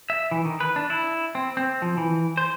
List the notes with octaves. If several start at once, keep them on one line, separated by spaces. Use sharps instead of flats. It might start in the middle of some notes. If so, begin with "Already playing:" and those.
E5
E3
D#3
B4
D4
E4
C4
C4
F3
E3
C5